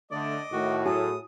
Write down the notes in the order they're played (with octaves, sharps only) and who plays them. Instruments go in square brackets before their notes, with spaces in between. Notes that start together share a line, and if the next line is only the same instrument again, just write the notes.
[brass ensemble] D3 A3 [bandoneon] D5 [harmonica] D#5 D6
[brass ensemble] A2 [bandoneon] D#3 F#4
[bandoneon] F#3 A4 [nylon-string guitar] F#4 G#4 [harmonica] D#6